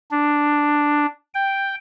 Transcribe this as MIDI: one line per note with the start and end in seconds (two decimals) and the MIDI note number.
0.11 1.06 62
1.34 1.75 79